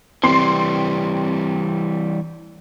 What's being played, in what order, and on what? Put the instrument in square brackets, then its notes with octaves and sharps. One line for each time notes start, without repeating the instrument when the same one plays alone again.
[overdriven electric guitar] E3 G3 [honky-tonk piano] C4 C6 C7